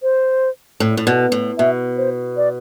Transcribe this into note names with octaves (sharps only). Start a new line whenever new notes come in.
C5
A2
A2
B2
A2
B2 E5
C5
D5